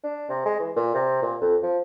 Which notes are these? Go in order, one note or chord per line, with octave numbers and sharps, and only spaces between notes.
D4
C3
G#3
E3
A#2
C3
A#2
F2
F3